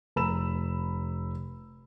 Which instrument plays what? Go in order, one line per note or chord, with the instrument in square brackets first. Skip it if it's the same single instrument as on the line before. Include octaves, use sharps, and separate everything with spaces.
[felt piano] F1 A#5 B5 E6 E7